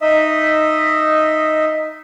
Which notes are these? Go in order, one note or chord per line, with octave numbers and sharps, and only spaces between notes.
D#4 D#5 E5